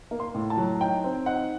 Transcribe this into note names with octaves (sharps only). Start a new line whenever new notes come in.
A#3
C6
A2
A5
F#3
D#4 G5
C4
D#4 F#5